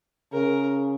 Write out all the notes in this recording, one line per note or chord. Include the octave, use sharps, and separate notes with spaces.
C#3 A#4